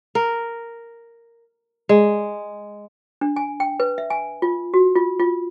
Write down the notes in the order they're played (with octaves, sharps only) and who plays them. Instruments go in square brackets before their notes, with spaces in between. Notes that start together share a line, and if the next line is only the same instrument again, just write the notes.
[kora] A#4
G#3
[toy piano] D4
G#5
G5
B4
E5
G#5
F4
F#4
F4
F4